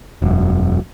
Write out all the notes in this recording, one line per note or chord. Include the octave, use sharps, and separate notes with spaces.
E1 F#2